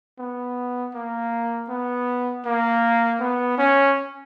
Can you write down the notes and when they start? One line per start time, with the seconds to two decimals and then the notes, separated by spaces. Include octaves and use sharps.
0.18 B3
0.94 A#3
1.69 B3
2.45 A#3
3.20 B3
3.58 C#4